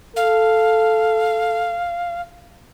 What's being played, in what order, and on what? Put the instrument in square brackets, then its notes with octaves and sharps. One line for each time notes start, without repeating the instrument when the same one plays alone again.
[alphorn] A4 [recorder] F5